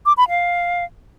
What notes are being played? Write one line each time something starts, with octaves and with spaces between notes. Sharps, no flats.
D6
B5
F5